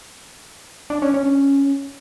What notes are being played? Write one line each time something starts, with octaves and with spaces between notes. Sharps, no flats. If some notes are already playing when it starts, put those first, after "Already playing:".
D4
C#4
C#4